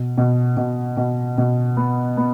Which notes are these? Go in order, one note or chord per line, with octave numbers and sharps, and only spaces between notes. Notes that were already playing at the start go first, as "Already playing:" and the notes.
Already playing: B2
B2
B2
B2
B2
B3
B3